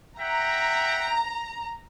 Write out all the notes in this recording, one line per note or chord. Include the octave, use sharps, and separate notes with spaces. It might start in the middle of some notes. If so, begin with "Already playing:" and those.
E5 F#5 G5 A#5